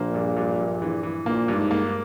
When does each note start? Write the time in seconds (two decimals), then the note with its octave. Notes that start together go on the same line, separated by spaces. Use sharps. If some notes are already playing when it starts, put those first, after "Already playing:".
Already playing: A#1 A#2 A#3
0.14 G2
0.37 G2
0.59 G2
0.82 E3
1.03 E3
1.26 A#1 A#2 A#3
1.48 G2
1.55 G#2
1.71 A#3